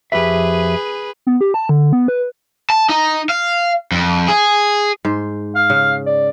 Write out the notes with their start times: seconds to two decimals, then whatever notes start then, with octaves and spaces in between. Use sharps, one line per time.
0.12 F2 G4 G#4 B4 E5
1.27 B3
1.41 G4
1.54 A5
1.69 D3
1.93 B3
2.08 B4
2.70 A5
2.89 D#4
3.29 F5
3.92 F2
4.28 G#4
5.05 G#2 C5
5.55 F5
5.70 C#3
6.06 D5